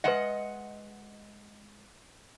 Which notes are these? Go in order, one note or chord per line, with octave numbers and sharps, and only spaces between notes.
G#3 B4 D#5 E5 F#5